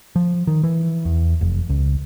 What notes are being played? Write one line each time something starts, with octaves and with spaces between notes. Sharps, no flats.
F3
D#3
E3
E2
F1
C#2